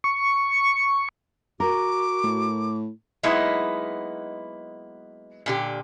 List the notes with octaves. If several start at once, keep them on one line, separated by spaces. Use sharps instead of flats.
C#6
F#4 A#4 D6
A2
F#3 G#3 A#3 B3 D#4 E4
A#2 D3 G4